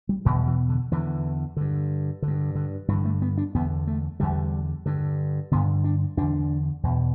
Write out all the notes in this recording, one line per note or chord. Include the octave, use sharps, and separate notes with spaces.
G3
E2 B2 D3
E3
D3
E2 D3 E3
G2 D3
D3
G2
D3
G2 D3 E3
A3
B3
D4
E2 D3 B3
A3
E2 D3 G3
G2 D3
G2 D3 B3
D4
E2 D3 D4
E2 B2